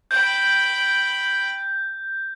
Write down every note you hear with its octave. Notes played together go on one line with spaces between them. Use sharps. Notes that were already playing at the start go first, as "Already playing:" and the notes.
G5 B5 G6